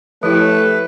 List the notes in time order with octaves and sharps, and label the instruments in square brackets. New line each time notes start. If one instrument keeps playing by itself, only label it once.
[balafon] F3 E4 [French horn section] A3 G4 C#5 [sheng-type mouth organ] B4